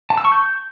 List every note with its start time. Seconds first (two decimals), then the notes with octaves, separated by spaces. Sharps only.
0.10 A5
0.18 E6
0.25 C#6
0.32 G6